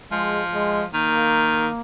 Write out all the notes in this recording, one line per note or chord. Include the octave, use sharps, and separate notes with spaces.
F3 G#3
G#3
D#3 A#3